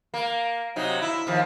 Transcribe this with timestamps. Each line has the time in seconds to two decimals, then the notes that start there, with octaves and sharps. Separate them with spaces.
0.14 A#3
0.76 C3 F#3 D#4
1.02 E4
1.27 D#2 F3